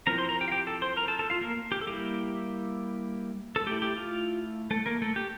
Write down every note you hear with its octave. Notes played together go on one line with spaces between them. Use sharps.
F3 C4 E4 A#4 A#5
C5 C6
A#4 A#5
G4 G5
F5
G4 G5
A4 A5
C5 C6
A#4 A#5
A4 A5
A4 A5
F4 F5
A#3 A#4
G4
A4
G3 A#3 E4 G4
A4
A3 E4 G4
G4
F4
A3 A4
A#3 A#4
A3 A4
G4